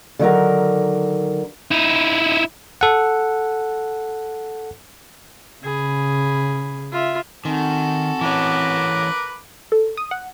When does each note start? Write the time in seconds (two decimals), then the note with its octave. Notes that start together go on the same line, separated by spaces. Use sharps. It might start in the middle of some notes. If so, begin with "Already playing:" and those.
0.19 D3 D#3 F#3 A#4
1.71 D#4 E4
2.81 A4 F#5
5.64 C#3 G#4 B5
6.92 F4 E5
7.45 D#3 C4 F#4 A4 G#5
8.21 E3 C#4 A#4 B4 D6
9.72 A4
9.97 D#6
10.11 F#5